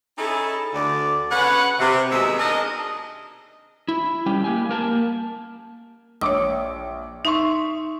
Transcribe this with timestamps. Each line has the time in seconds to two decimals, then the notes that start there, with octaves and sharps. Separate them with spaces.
0.18 C#4 D#4 E4 G#4 A4
0.74 D2 D3 D5
1.31 C#3 C#4 B4 F#5
1.80 C3
2.11 D#2 B2 G#3 D#4 G#4 E5
2.38 D4 D#4 G#4 A#4 D#5
3.88 E4
4.26 G3 C#4 G4 G5
4.44 A#3 G4 G#5
4.69 A#3 A#4 A5
6.21 A#1 C#5 D6 D#6
7.25 D#4 E5 C6 C#6